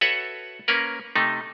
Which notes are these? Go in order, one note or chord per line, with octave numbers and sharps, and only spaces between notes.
F#4 A4 B4 C#5 E5 F#5
A#3 C#4 A#4 B4
C3 A3 D#4